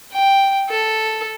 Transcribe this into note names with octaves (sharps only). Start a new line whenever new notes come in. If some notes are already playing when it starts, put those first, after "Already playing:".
G5
A4